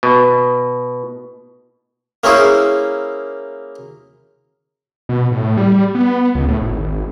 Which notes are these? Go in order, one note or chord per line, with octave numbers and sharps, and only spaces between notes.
B2
A#3 C#4 E4 G#4 C5
B2
A2
G3
B3
C#2
A2
G#1